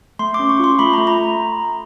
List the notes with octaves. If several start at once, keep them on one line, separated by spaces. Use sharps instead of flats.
A3 C6
D6
C#4
C#6
F4 C6
A3 B5
A#5
A3
A#5